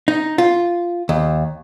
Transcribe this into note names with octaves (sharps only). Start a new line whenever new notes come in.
D#4
F4
D#2